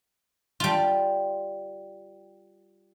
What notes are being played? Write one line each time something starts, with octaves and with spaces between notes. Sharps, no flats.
G3 F4